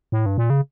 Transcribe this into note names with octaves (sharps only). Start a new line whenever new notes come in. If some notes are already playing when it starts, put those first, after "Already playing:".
A2
G2
A#2
C#3